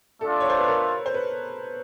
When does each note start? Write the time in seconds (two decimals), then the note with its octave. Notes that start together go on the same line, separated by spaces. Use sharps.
0.21 A3 D4 F4 A4
0.40 C#5
0.50 C5
0.59 B4
0.68 A#4
1.06 C5
1.14 B4